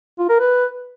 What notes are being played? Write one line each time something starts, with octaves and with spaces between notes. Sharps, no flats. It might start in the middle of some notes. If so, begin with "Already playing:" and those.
F4
A#4
B4